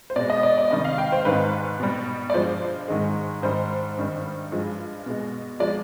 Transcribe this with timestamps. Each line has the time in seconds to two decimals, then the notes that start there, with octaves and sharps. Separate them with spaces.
0.10 C5
0.16 B2 G#3 D5
0.30 D#5
0.43 D5
0.58 D5
0.71 C3 D#3 G3 D#5
0.85 F5
0.98 G5
1.12 C5
1.25 G#2 D#3 G3 B4
1.80 B2 G3
2.30 D5
2.34 G2 F3 G#3 C5
2.88 G#2 D#3 G#3
3.42 G#2 D#3 G3 C5
3.97 G2 D#3 G3
4.52 G2 F3 G#3
5.06 B2 G#3
5.60 F3 G#3 D5